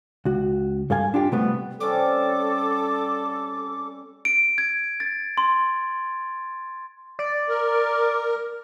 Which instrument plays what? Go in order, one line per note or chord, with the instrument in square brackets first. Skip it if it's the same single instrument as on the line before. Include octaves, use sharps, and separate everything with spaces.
[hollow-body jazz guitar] C#2 F#4
G2 A4 F5 G#5
D4 F4 G4
C3 G3 A3 B3 C4
[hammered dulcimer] G3 C4 C#4 [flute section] A4 [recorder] D6
[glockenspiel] D7
G#6
A6
C6
[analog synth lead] D5
[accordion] A#4